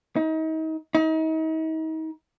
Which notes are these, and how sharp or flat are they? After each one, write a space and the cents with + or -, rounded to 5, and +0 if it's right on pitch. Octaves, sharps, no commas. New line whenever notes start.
D#4 +35
D#4 +35